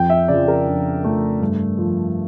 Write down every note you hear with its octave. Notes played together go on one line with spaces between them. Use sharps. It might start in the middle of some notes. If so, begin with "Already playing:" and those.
Already playing: F2 G5
E5
C#3 D5
F3
A#4
F2 D4
C#3 F3 A3
G2
F3